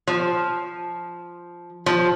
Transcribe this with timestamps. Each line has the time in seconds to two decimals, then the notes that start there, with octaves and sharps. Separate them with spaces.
0.07 F3
1.86 F3